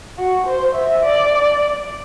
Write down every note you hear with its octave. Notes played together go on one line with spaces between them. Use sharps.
F#4
C5
E5
D5